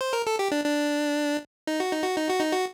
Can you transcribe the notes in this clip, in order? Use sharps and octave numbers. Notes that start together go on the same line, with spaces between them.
C5
A#4
A4
G4
D4
D4
D#4
F#4
D#4
F#4
D#4
F#4
D#4
F#4